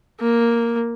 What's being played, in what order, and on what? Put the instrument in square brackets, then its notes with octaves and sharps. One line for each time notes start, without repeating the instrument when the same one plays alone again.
[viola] A#3